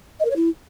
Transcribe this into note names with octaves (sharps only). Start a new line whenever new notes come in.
D#5
A#4
C#5
E4